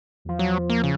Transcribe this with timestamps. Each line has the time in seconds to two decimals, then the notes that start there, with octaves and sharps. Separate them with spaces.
0.25 E2 F3
0.39 F#3
0.70 A#3
0.84 C#3